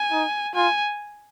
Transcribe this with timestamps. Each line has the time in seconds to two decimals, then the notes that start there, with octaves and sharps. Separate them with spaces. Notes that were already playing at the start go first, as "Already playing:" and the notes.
Already playing: G#5
0.11 D#4
0.55 F4 G#5